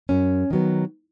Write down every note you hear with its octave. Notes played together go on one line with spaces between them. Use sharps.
F#2 C#4
D#3 F#3 B3